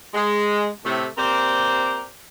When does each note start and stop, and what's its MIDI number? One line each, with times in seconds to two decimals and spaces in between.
0.14 0.67 56
0.85 1.05 45
0.85 1.05 48
0.85 1.05 57
1.18 2.05 58
1.18 2.05 60
1.18 2.05 67
1.18 2.05 70
1.18 2.05 72
1.18 2.05 74